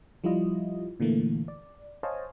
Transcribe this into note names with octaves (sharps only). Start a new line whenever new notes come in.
F3 G3 E4 F4 D#5
A#2 D3 E3 A3 A#3
D5
C5 C#5 D#5 F5 G#5 A5